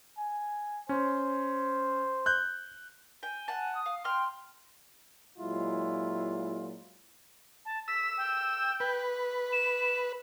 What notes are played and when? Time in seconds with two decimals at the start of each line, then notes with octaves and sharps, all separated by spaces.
0.18 G#5
0.89 C#4 C5
2.26 F#6 G6
3.23 G5 G#5
3.48 F#5 A5
3.74 D#6
3.86 F5
4.04 G5 C6 F6
5.39 A#2 F#3 G#3 E4 F4
7.65 A5
7.88 E6 B6
8.17 G5
8.80 B4
9.52 E7